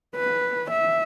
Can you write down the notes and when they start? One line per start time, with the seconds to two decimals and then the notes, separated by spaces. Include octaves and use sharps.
0.16 B4
0.71 E5